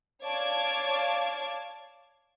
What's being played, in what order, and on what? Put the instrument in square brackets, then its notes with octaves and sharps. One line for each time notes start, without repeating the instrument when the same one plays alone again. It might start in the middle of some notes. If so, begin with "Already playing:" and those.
[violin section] C#5 D5 F5 A5 D6 G#6